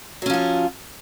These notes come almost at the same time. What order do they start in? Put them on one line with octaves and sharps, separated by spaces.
F#3 C#4 F3 F4